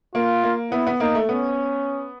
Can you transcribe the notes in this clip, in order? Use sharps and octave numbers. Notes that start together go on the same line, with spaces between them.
A#3 F4
A#3
B3 E4
B3
A#3 D#4
A3
B3 C#4